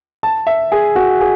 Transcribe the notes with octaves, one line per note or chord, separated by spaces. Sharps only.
A5
E5
G#4
F#4
G#4